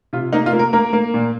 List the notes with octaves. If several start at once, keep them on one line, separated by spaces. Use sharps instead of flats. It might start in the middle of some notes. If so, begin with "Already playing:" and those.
C3 F4
A#3 D#4
F4
A#3
A#4
A#3 A#4
A#3
A#2